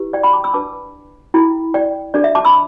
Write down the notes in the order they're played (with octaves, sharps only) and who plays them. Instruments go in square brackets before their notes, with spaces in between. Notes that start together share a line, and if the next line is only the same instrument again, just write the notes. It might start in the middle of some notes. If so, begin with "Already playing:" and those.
Already playing: [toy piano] E4 G4 B4
D5 G5
G5 B5
A5 D6
B5 E6
D4 B4 A5 D6
E4 A4 G5 B5
D5 G5
D4 A4 D5
E5
A5 D6
B5 E6